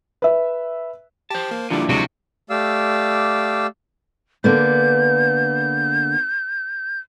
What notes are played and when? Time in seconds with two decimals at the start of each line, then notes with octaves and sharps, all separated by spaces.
0.22 B4 E5
1.30 G4 C5 A5
1.51 A#3
1.70 A#2 D3 F3 G3 D4 E4
1.89 D2 C3 F#3 G#3 F#4
2.50 A3 G4 D5 F5 E6
4.44 D3 A#3 B3 G6